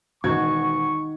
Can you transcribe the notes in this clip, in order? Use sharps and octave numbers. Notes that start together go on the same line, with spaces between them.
E1 D#3 F#4 C#6 G#6